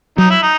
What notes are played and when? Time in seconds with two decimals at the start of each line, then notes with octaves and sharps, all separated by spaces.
0.18 F#3 D#4
0.30 E4
0.42 D#4